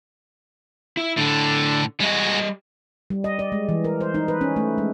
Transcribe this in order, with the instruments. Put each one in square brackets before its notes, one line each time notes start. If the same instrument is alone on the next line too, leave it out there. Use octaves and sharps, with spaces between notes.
[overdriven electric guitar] E4
[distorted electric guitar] A2 D4 [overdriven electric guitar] D3
[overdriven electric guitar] G3 D#5 [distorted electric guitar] G#3 F#4
[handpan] G3
D#5
D5
G#3
E3
A#4
C5
D#4
B4
C#4
A3
G#3